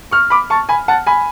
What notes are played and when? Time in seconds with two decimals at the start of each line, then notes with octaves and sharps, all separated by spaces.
0.11 C#6 F6
0.30 B5 D6
0.50 A5 C#6
0.69 G#5 B5
0.88 F#5 A5
1.06 G#5 B5